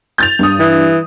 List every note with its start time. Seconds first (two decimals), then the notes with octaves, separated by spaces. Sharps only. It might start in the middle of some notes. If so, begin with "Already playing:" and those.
0.18 G6 A6 F7
0.39 G2 D#6
0.59 E3